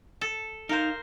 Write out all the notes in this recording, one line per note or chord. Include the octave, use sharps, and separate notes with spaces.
A4
D#4 A#4 C5 F5